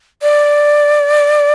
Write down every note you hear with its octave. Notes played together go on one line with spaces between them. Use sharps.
D5